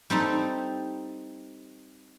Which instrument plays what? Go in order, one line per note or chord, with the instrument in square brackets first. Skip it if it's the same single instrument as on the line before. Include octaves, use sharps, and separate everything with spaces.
[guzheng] G3 C4 D#4 A4